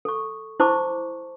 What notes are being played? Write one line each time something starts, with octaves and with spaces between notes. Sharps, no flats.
A4 C#6
E4 C5 A5 B5 C#6 D6